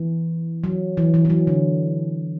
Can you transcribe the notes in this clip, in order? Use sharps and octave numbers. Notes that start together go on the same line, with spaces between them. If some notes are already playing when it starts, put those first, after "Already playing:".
Already playing: E3
F#3
E3
E3
E3
F#3
D3